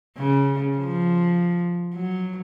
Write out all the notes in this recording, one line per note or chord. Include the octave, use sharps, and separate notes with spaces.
C#3
F3
F#3